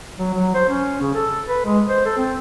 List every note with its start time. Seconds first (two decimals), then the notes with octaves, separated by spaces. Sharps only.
0.19 F#3
0.34 F#3
0.55 C5
0.69 C#4
1.01 C#3
1.15 A4
1.48 B4
1.66 G#3
1.88 C5
2.06 A4
2.17 C4